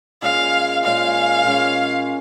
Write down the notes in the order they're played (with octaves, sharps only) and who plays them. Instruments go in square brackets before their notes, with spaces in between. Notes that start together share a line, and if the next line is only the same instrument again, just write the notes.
[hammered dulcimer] A#2 G#3 C#4 G#4 [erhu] F5
[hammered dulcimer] A#2 G#3 C#4 G#4 [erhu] F5
[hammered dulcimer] A#2 G#3 C#4